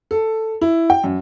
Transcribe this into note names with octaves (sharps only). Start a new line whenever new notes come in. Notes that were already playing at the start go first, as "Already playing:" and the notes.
A4
E4
G5
F#2